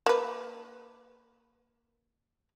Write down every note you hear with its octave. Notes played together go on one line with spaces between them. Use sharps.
A#3 B4